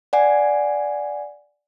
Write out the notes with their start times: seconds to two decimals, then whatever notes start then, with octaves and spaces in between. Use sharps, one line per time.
0.13 D5 F#5 G#5